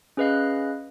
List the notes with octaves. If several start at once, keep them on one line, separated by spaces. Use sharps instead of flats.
C#4 G#4 B4 D#5 F5 F#6